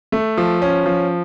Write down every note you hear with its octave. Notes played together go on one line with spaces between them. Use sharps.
A3
F3
C#4
F3